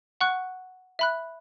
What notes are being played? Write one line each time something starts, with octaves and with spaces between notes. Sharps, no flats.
F#5 C#6 F#6
E5 B5 F#6